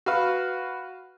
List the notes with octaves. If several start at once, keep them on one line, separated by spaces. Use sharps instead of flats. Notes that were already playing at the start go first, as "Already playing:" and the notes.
F#4 B4 F5